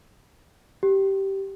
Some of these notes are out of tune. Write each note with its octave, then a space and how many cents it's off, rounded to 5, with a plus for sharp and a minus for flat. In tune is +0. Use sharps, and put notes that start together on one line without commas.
G4 -15